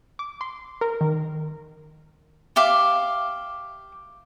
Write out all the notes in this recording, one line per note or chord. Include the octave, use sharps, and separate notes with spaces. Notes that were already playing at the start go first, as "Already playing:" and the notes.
D6
C6
A#4
D#3
G4 E5 F5 D6